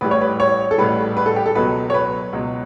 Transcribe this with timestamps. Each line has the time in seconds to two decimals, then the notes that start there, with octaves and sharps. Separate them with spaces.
0.01 A1 A2 G3 B4
0.11 C#5
0.21 B4
0.40 C#5
0.71 A4
0.78 A1 A2 G3 B4
1.17 B4
1.26 A4
1.36 G4
1.46 A4
1.55 C#2 B2 F#3 B4
1.90 C#5
1.94 B4
2.33 C#2 B2 F#3